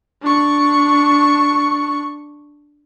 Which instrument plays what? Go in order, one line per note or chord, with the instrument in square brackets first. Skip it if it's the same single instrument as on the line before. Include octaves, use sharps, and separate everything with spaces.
[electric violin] D4 C#6